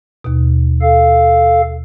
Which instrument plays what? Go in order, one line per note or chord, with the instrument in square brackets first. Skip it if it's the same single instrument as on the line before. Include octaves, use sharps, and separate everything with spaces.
[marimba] D#2 B2
[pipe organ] A4 F5